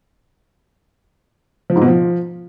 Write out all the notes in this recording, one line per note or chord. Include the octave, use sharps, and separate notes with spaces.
F3
G#2
B2
F3